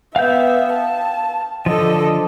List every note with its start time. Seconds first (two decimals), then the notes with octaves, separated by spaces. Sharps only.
0.16 B3 E5 F5 G5 G6
0.72 A5
1.66 D3 F3 A4 D#5